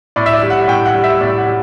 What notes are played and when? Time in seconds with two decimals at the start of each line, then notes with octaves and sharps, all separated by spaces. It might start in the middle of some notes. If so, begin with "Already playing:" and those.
0.16 A2 D5
0.26 E5
0.33 D5
0.42 G3
0.50 F#5
0.68 A2 G5
0.85 F#5
0.95 G3
1.04 E5
1.21 A2 D5
1.38 F#5
1.47 G3